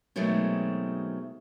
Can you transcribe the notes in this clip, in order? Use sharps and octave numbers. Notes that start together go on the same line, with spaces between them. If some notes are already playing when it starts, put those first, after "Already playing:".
B2 D#3 F#3 G#3 A3 C4